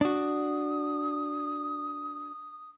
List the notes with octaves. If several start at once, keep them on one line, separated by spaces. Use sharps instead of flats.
D4 F#4 D#6